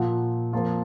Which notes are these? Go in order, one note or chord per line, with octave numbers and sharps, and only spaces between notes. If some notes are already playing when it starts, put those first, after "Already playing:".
Already playing: A#2 F3 A#3 F#5
F2 F3 A#3 F4